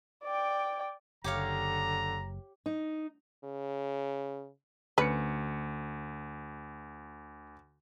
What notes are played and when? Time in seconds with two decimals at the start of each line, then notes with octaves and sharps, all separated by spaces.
0.24 D5 G5
1.24 F#1 D3 G4 C#5 F5 A#5
2.66 D#4
3.44 C#3
4.98 D2 C#4 B4 C#7